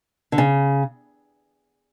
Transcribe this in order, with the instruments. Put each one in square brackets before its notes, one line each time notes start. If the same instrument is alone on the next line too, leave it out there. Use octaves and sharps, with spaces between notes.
[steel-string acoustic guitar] D3
C#3